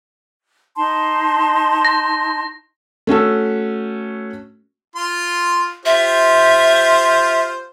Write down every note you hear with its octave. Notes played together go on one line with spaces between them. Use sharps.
D#4 A5 C6
A#6
A3 C#4 F#4 A4
F4 C6
F4 G4 C5 E5